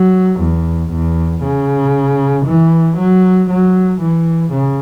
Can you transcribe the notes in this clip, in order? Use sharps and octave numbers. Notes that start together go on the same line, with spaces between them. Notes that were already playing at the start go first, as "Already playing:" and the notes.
Already playing: F#3
E2
E2
C#3
E3
F#3
F#3
E3
C#3